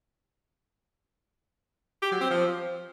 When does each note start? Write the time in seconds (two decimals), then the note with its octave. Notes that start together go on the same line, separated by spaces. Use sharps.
2.03 G4
2.12 F#3
2.21 C4
2.30 F3